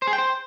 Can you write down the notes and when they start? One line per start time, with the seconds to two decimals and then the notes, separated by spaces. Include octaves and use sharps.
0.02 C5
0.07 G#4
0.13 G5
0.18 C5